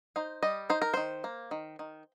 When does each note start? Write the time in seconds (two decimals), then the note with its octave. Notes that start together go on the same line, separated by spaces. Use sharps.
0.16 D#4 C5
0.43 G3 D#5
0.70 D#4 C5
0.82 A#4
0.94 D#3 C5
1.24 A#3
1.51 D#3
1.79 D#3